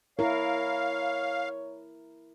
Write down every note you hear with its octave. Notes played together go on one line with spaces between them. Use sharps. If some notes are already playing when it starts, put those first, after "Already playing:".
E4 A#4 C#5 F5